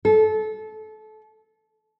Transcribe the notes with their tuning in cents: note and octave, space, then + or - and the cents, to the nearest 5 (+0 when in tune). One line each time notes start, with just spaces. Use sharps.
A4 -25